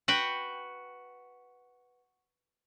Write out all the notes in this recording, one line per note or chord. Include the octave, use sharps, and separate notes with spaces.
F#4 B4 F#5 G5